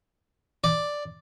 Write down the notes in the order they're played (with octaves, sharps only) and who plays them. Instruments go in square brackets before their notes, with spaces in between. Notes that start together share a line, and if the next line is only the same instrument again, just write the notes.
[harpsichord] D5